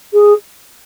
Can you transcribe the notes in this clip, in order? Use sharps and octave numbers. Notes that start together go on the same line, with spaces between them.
G#4